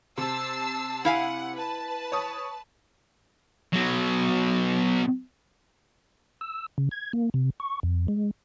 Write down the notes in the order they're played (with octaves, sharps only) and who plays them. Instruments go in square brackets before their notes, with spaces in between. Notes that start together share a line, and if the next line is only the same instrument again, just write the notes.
[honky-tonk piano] C3 [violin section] A5 E6 C7
[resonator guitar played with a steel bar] E4 F5 G#5 [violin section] F#5
[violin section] B4 A5
[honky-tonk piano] C#5 D#6
[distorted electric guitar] B2 F#3
[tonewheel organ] E6
C#3
G#6
A#3
C3
C#6
F2
G#3